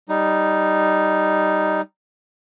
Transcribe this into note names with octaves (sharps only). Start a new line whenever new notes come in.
G3 D#4